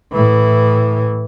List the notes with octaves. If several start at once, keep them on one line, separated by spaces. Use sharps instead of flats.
A2 E3